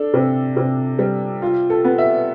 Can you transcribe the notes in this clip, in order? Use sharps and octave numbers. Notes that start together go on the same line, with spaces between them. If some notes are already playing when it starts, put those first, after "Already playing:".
Already playing: D4 A4
C3
C3
G3
F4
A4
B3
E5